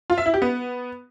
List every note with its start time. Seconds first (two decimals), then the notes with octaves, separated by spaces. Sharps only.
0.10 F4
0.18 E5
0.26 E4
0.34 G4
0.42 B3